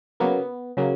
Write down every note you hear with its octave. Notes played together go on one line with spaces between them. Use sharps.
C#3 F#3 A#3 B3
C#3 F#3 A#3